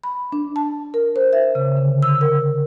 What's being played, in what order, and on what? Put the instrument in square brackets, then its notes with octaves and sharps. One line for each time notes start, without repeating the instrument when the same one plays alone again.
[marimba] B5
D4
A5
A#4
C5
E5
C#3
D3
E6
A#4